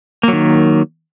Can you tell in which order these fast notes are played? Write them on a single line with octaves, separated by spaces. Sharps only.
A#3 F#3 D#3